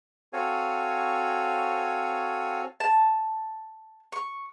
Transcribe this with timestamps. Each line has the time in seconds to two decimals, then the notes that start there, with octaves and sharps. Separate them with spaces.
0.33 C4 F#4 A4 C#5 F5 G#5
2.80 A5
4.12 C#6